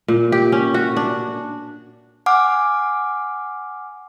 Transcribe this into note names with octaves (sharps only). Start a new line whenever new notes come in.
A#2
G4
C#4
F#4
D4
F#5 G#5 D6 F6